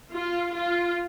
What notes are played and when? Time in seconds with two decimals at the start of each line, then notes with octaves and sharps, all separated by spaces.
0.12 F4
0.52 F4